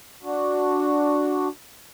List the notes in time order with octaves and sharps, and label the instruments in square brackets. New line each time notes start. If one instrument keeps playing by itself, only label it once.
[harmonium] D4 F#4